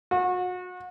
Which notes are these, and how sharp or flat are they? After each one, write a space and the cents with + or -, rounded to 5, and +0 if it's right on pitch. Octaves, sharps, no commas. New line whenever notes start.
F#4 -35